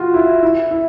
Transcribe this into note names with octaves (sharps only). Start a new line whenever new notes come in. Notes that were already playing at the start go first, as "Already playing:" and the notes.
Already playing: F4 F#4
E4
E4
E4